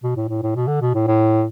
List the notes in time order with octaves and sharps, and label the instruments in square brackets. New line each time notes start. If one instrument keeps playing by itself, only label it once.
[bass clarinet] B2
A2
A2
A2
B2
D3
B2
A2
A2